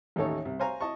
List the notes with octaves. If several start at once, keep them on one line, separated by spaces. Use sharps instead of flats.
A1 D#2 A2 D#4 A4 C#5
C2
C5 C#5 F5 G#5 A#5
E4 D#5 A5 C#6